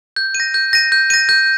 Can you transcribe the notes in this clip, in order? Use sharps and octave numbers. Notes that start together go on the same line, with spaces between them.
G6
D#7
A#6
G6
A#6 D#7
G6
A#6 D#7
G6